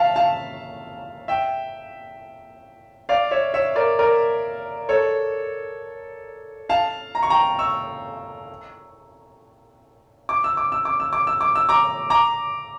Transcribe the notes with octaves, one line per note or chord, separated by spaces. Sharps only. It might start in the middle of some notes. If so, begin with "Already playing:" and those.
Already playing: E5 F5 A5
F5 A5
E5 G5
D5 F5
C#5 E5
C#5 E5
A#4 D5
A#4 D5
A4 C#5
F5 A5
A#5
C#6
G5 A#5
C#6 E6
D6
E6
D6
E6
D6
E6
D6
E6
D6
E6
A#5 D6
A#5 D6